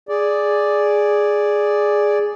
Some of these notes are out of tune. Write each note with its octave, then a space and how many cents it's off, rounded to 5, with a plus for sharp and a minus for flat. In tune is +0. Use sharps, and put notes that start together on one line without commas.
G#4 +0 D5 +0